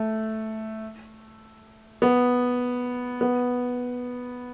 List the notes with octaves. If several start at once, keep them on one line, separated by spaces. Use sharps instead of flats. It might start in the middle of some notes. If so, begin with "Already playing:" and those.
Already playing: A3
B3
B3